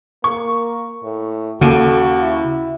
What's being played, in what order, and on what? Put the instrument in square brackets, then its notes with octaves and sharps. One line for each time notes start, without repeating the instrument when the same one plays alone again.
[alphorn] A#3 [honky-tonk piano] C#6
[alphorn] A2
[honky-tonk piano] D#2 [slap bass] C#3 [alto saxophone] F#4 [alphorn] A4
[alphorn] E4